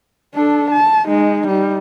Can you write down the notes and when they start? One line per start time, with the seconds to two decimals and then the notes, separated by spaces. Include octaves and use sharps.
0.34 D4 A4
0.71 A5
1.07 G#3 D#4
1.48 G3 D#4